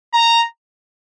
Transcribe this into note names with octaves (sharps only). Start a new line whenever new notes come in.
A#5